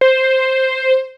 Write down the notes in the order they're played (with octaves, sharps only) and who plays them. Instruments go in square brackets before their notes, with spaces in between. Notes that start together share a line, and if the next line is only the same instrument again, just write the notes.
[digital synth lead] C5